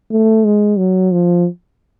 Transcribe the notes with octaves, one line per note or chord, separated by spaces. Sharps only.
A3
G#3
F#3
F3